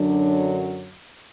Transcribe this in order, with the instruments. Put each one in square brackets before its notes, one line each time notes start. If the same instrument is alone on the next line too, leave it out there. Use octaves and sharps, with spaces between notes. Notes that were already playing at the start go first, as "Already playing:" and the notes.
Already playing: [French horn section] F#2 D3 F#3 D4